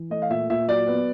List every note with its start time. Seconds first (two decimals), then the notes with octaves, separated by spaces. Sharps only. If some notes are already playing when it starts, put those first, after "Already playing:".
Already playing: E3
0.10 A3 D#5
0.22 F5
0.30 A#2 E5
0.50 A#2 E5
0.68 F#3 D5
0.88 B3